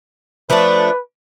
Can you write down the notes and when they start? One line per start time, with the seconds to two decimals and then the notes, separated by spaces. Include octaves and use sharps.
0.50 F3 A3 D4 B4